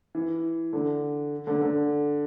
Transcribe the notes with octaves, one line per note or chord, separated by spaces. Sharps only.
E3
D3
D3
D3